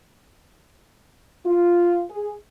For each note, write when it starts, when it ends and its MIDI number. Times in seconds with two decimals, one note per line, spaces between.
1.46 2.03 65
2.10 2.34 68